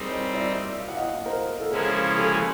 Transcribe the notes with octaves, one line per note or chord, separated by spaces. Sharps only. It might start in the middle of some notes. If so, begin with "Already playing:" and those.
Already playing: G3 C4 D#4 G#4 A#4
C#5 D#5
D5 E5
F5
F#5
D#5 F5
A#4 C5
A4
C#3 F3 G#3 C#4 E4 G#4 A#4
G4 A4